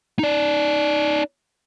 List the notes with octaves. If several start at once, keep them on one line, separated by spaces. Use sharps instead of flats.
D#4 D5